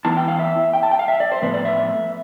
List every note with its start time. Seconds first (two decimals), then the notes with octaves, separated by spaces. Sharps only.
0.05 E3 B3 E4 A5
0.17 G5
0.28 F5
0.39 E5
0.73 G5
0.83 A5
0.91 G5
0.99 F5
1.08 E5
1.20 D5
1.32 C5
1.42 A2 F3 B3 B4
1.54 D5
1.65 E5